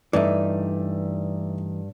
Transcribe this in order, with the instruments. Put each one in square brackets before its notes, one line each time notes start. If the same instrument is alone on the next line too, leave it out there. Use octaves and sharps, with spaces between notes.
[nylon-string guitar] G2 [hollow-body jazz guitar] E3 A3 D#4 [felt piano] D5 E5